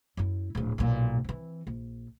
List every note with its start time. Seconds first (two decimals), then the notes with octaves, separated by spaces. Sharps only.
0.17 F#2 E4
0.55 D1 A#1
0.78 B1 A#2
1.24 E3 C4
1.67 A#1